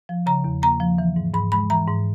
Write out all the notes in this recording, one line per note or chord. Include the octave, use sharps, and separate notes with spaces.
F3
C#3 A#5
E2
A#3 A#5
F3
E3
G#2
G#2 B5
G#3 B5
E3 A#5
G#2